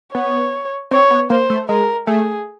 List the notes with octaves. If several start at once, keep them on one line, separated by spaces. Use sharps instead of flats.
B3 C#5
C4 C#5
B3
A#3 C5
A3
G#3 A#4
A3 G#4